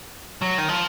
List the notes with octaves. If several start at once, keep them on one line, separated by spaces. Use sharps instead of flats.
F#3
D#3
F3